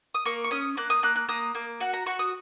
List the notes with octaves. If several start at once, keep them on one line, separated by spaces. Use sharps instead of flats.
D#6
A#3 C#6
C#6
C#4 D#6
A#3 F#6
D#6
A#3 F#6
F#6
A#3 D#6
A#3
F#4 F#5
A#5
F#4 C#6
D#6